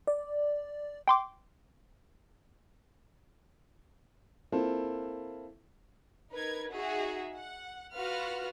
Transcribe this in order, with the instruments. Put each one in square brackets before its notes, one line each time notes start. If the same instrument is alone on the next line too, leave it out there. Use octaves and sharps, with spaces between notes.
[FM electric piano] D5
[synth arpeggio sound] G5 C6 D6
[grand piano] A#3 C4 E4 F4 A4
[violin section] D#4 A#4 B4 G#6
D#4 F#4 G#4 E5
F#5
F4 F#4 B4 F#5 F6